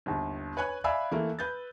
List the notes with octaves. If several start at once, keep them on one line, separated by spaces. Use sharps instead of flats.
G1 D#2
B4 C#5 G#5 F#6
D5 E5 F5 G#5 B5 E6
E3 A3 A#3
B4 G6 A6